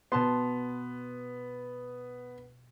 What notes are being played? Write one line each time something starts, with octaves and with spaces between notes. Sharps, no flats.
B2 B3 A5 C6